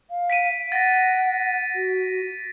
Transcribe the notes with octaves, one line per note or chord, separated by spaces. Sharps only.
F5
B6 D7 D#7
F#5 A6 A#6
F#4